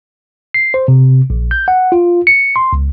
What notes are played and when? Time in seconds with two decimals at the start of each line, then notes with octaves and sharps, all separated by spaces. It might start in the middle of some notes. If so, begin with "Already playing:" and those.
0.54 C7
0.74 C5
0.88 C3
1.30 A#1
1.51 G6
1.68 F#5
1.92 F4
2.27 C#7
2.56 C6
2.73 C#2